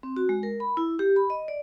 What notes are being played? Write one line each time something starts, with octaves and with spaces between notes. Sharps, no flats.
C4
F#4
G#3
A#4
B5
E4
G4
B5
D#5
D5